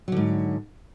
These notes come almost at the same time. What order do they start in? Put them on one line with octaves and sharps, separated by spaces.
F#3 D3 G#2